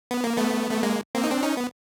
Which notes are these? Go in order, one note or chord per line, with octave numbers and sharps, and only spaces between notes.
B3
A#3
A3 B3
A3
G#3 A#3
A#3 C4
D#4
C4 D4
C#4 D#4
B3